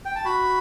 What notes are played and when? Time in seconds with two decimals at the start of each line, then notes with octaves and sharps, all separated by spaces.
0.05 G5
0.15 A5
0.25 F#4 B5